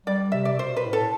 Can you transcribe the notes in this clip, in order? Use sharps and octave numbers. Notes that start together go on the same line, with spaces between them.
G3 D5
C3 E5
D5
B2 C5
B4
A2
A4